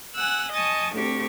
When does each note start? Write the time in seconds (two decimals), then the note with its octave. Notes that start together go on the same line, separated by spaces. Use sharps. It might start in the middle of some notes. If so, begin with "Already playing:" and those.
0.14 F#5 G#5 E6 F#6
0.51 D#5 G#5 A5 C#6 D#6
0.94 D2 A2 C4 G4 C#6